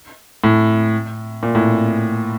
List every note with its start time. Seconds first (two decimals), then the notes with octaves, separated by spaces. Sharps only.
0.44 A2
1.43 A#2
1.55 A2